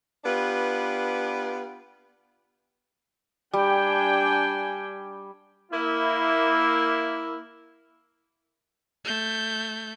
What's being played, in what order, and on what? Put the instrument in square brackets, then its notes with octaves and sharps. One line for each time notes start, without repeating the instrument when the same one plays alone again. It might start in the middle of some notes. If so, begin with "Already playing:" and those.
[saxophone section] B3 D4 F4 G4 B4
[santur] G3 [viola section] D4 G5 G#5
[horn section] A#3 E4
[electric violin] A3 G6